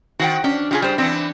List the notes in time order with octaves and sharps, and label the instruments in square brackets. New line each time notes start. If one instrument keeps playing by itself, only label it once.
[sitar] D#3 C4 [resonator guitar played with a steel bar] F#4 F#5 G5
[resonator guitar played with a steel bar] C#4 [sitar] D4
[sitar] C#3 [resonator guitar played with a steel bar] G3 F4 G#4
[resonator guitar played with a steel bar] G3 C5
[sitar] E3 B3 D4 [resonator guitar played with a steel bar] C4